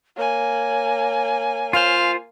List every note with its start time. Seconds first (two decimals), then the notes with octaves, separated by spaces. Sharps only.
0.17 A#3 C#5 G#5
1.73 F4 C5 F5